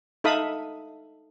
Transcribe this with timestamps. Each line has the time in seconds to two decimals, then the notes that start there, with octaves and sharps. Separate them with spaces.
0.24 D#4 A4 E5 F5 B5 D#6